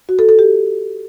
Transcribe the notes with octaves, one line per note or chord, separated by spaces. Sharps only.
F#4
A4
A4
G4